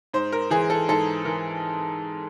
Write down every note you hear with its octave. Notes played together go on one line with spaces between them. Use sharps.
G#2 C5
A#4
E3 G#4
A4
G#2 A4
E3 A#4